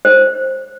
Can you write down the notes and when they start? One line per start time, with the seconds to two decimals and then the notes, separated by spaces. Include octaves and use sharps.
0.05 C5